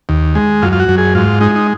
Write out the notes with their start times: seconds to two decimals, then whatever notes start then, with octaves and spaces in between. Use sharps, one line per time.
0.09 D#2
0.35 G#3
0.62 F#2 F4
0.73 F4
0.80 F#4
0.89 F#2
0.98 G#4
1.15 G#2 F4
1.41 G#3 D#4
1.55 D#4